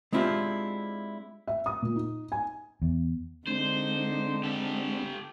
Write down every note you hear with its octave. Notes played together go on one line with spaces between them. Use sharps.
G#3 C4 D4 E4 F4 G4
E5
D#6
A#2
D#4
G#5
E2
D3 G#3 C4 D4 D#4 C5
G4 A4